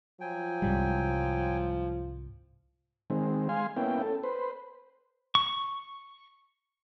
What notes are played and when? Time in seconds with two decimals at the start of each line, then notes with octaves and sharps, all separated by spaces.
0.21 F3 F#3 G5 G#5
0.62 C2 G#2 G3
3.10 D#3 G#3 C4
3.49 G#3 F5 G#5 C6
3.76 A#3 B3 C#4 E4 G5
4.02 A4
4.23 B4 C5
5.35 C#6